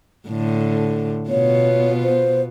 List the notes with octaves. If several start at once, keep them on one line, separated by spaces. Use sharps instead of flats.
A2 D3
B2 B3 F4 C#5
C5